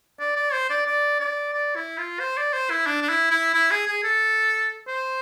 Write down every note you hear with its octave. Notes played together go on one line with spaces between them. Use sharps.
D5
D5
C5
D5
D5
D5
D5
E4
F4
C5
D5
C5
E4
D4
D4
E4
E4
E4
G#4
G#4
A4
C5